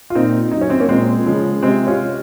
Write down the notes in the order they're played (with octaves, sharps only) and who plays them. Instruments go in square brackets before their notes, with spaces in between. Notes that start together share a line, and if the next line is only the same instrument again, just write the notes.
[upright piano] F4
[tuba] A#2 [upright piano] C4 D#4
[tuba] F#2 [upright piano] D#4
[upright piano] C#4
C4
A#3 C#4
[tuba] A#2 [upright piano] G#3 C4
[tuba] C#3 [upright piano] F3 G#3
[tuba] C3 [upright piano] G#3 C4
[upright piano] C#4 F4